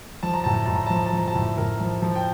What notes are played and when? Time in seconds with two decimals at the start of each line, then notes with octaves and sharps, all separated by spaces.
0.23 F3 A5
0.34 A#5
0.44 A2 A5
0.55 A#5
0.65 A2 A5
0.75 A#5
0.86 F3 A5
0.96 A#5
1.06 A5
1.12 F3
1.18 A#5
1.28 A5
1.35 A2
1.57 A2 A#4
1.80 F3
2.02 F3
2.15 G5